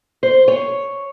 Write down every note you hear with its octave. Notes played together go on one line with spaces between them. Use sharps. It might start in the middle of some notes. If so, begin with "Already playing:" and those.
C5
C#5